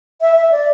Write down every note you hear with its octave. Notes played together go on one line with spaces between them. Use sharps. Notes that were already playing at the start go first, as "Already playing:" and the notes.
E5
E5
D5